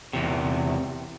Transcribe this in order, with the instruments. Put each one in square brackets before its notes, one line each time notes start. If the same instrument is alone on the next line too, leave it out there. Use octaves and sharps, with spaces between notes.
[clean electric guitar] E2 C3